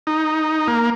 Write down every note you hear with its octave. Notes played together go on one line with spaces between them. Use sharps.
D#4
A#3